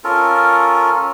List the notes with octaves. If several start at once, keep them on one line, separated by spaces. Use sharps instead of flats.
C#4 F4 A4 A#4